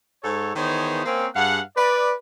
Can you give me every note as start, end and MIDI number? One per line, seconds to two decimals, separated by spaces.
0.24 0.52 44
0.24 0.52 69
0.24 0.52 73
0.55 1.03 51
0.55 1.03 52
0.55 1.03 59
0.55 1.03 68
0.55 1.03 72
0.55 1.03 73
1.05 1.26 58
1.05 1.26 60
1.05 1.26 61
1.35 1.60 43
1.35 1.60 68
1.35 1.60 77
1.35 1.60 78
1.76 2.12 71
1.76 2.12 74